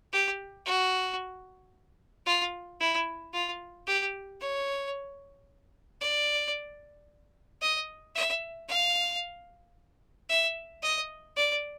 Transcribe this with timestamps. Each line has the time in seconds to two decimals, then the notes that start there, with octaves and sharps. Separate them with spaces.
0.13 G4
0.66 F#4
2.27 F4
2.80 E4
3.34 F4
3.87 G4
4.41 C#5
6.01 D5
7.62 D#5
8.15 E5
8.69 F5
10.29 E5
10.83 D#5
11.37 D5